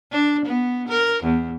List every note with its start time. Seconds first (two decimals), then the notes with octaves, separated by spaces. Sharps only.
0.12 D4
0.46 B3
0.88 A#4
1.24 E2